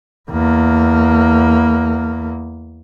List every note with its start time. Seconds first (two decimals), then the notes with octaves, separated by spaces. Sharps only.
0.30 E2 A#3